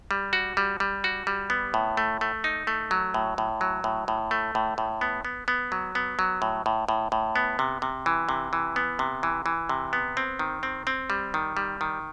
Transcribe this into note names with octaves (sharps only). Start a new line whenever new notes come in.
G3
F#4
G3
G3
F#4
G3
B3
A2
A3
A3
D#4
A3
F#3
A2
A2
F#3
A2
A2
A3
A2
A2
B3
B3
B3
F#3
B3
F#3
A2
A2
A2
A2
B3
C3
C3
E3
C3
E3
B3
C3
E3
E3
C3
B3
C4
D#3
C4
C4
G3
D#3
G3
D#3